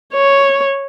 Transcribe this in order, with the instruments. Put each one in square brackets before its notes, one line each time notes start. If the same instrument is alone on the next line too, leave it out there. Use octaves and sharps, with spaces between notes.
[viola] C#5